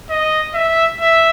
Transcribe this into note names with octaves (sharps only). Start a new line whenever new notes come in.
D#5
E5
E5